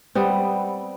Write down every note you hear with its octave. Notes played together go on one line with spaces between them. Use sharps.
G3 B3 C4